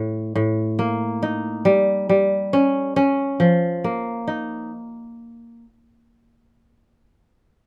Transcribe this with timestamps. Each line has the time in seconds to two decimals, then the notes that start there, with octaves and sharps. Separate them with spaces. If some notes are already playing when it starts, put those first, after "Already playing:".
Already playing: A2
0.35 A2
0.79 A#3
1.23 D#4
1.65 G3
2.09 G3
2.53 C#4
2.96 C#4
3.40 F3
3.84 A#3
4.28 D#4